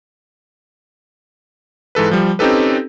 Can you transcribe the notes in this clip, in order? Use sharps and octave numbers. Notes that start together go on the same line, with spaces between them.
G#2 E3 A4 B4
F3 G3
C4 C#4 D#4 G4 A4 B4